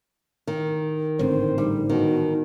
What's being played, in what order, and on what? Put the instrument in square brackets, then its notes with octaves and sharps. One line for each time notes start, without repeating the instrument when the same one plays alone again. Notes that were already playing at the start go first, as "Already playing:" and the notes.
[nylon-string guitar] D#3
[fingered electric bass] A1 G#2 D3 [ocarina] C4 [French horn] C5
[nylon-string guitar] G3 [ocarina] D#4
[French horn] B2 [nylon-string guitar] D#3